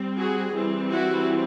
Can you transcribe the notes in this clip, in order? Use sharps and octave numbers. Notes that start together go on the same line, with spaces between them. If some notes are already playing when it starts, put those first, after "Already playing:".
Already playing: G3 C4
F#4 G#4
E3 G3 C4
E4 F#4